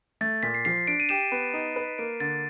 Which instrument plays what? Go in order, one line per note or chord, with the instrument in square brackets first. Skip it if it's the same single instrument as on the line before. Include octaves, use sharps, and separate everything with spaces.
[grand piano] A3 [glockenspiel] A6
[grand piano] A#2 [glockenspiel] B6
[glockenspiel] C7
[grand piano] F3 [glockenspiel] C7
[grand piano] D4 [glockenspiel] D7
[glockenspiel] D#7
[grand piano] G4 [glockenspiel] E7
[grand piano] B3
D#4
B4
[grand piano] A#3 [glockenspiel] D7
[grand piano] D3 [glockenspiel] A6